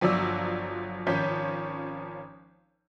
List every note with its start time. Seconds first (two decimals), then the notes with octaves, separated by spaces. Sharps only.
0.01 G1 F3 F#3 D5 E6
1.07 G#1 F3 C#4 C#5 G6 B6